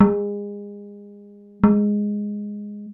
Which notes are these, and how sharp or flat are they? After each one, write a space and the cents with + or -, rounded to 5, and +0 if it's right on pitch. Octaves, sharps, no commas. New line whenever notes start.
G#3 -30
G#3 -5